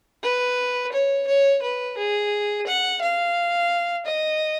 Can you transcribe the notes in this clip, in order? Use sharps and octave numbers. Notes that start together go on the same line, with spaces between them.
B4
C#5
C#5
B4
G#4
F#5
F5
D#5